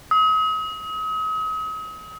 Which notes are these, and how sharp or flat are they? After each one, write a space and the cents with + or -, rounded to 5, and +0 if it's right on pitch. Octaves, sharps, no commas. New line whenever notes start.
D#6 +40